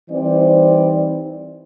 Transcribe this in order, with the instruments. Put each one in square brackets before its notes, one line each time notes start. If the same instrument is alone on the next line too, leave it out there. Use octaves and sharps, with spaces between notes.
[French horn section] E3 G3 C4 D#4 C5 D5